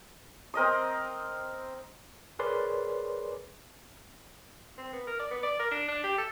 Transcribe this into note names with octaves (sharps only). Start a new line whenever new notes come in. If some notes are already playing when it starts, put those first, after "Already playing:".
C4 A#4 D#5 D#6
G#4 A#4 B4 C#5 D5 C6
C4
B3
A#4
D5
B3
D5
A#4
D4
D4
G4
A4